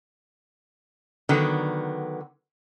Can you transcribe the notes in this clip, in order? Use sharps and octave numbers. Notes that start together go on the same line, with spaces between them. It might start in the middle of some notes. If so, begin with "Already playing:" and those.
D3 D#3 F#3 B3